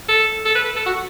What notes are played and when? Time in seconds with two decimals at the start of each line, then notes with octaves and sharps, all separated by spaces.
0.08 A4
0.45 A4
0.55 B4
0.65 B4
0.76 A4
0.86 F#4